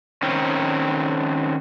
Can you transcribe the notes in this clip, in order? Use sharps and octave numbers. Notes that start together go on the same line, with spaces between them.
D#3 C4 C#4